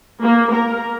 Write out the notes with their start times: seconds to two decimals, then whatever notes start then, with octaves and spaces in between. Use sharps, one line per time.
0.22 A#3
0.53 A#4